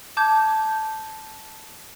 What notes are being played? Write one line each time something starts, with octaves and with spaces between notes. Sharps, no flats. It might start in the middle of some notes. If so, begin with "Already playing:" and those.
A5 D6 G6 G#6